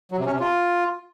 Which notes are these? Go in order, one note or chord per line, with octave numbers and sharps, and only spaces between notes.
F#3
C3
C#4
C3
F4